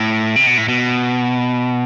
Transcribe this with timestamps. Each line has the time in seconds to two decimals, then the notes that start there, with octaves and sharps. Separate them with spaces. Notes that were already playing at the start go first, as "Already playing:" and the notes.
Already playing: A2
0.36 C3
0.47 B2
0.58 A2
0.68 B2